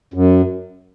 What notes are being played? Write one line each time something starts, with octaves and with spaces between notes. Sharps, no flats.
F#2